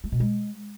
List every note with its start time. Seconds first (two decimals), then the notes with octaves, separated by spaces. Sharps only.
0.04 A3
0.12 B2
0.20 G#3